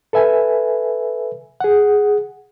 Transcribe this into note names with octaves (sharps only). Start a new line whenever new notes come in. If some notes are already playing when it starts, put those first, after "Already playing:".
A4 B4 E5 G#5
G#4 F#5